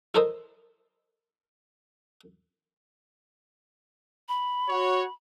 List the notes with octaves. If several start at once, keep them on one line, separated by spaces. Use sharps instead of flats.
E4 A4 A#4 C5 D#5
B5
F#4 C#5